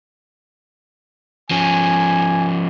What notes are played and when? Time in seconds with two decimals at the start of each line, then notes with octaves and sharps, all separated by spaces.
1.51 F3 C#4 G#5